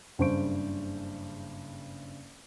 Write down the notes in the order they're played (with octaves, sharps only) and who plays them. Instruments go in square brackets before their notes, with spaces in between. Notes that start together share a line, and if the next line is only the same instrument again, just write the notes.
[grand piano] F#1 G2 C#3 C5 C#6 D7